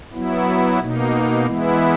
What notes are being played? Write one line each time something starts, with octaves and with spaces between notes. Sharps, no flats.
F#3 B3 E4
B2 A#3 D#4
E3 G#3 B3 E4